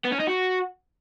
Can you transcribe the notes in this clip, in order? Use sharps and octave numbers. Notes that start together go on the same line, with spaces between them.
B3
C#4
D#4
F#4